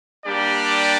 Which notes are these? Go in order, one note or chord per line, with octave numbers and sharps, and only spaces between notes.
G3 A#3 D4 G4 D5